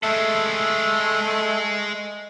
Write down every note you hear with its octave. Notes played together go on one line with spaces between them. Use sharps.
G#3 A3 A4